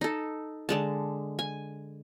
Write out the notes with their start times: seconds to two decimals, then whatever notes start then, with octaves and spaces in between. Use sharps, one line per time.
0.01 D#4 A4
0.69 D3 G#3 A5
1.39 G#5